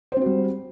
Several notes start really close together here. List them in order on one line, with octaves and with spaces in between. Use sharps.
C5 C4 F#4 G3